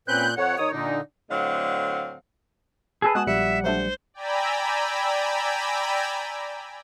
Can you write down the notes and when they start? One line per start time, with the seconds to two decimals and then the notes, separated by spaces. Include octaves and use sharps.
0.08 A#2 C4 C#4 B4 F#6 G6
0.37 F2 C#5 F#5
0.58 D#2 D#4 D#6
0.72 A#2 D3 D4 D#4
1.30 A2 D3 F#3 C4 D#5 F5
3.02 G#4 A4 B4
3.15 G#3 B3 F#4 F#5 G#5 A5 D#6 F#6
3.27 A#1 G3 E5 C#7
3.64 F#3 A3 D4 C5
4.14 D5 G5 G#5 A#5 B5 E6